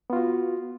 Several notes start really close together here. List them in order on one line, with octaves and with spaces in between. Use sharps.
B3 F4 F#4